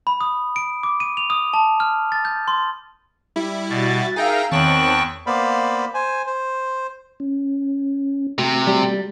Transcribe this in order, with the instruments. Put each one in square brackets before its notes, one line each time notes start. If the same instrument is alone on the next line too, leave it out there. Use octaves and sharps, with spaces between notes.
[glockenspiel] B5
D#6
D7
D6
D#7
F7
D#6
A5
F6
A6
G6
C6
[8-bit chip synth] G3 E4
[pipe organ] B2 [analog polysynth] F#4 A6
[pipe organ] D#4 [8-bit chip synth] G#4 G5 A#5 [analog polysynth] A#4 E5 F5
[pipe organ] E2 G5 C#6 [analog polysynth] D#3 C4 C#5 [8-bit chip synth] A5 F#6
[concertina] A#3 B3 C5 D5 F5 B5
C5 G#5
C5
[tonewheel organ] C#4
[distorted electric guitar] C3 [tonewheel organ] A3 F#4
[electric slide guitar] G3